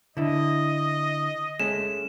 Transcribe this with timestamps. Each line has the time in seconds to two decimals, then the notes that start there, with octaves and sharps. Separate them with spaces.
0.17 D3 E4 D#5
1.60 G#3 A3 C#4 E7